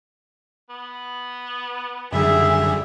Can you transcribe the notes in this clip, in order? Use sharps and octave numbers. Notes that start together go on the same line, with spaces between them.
B3
F#2 D3 G3 G#4 E5